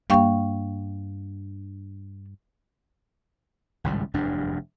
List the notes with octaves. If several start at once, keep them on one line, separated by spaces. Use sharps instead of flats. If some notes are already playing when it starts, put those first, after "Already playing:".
G2 A#3 D4 F5 G5 C#6
G#1 C#2 A2 G3
F1 E2 G2 D4